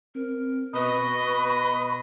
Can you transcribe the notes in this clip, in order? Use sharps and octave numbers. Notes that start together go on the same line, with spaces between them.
C4 A#4
B2 B4 D#5 B5 C#6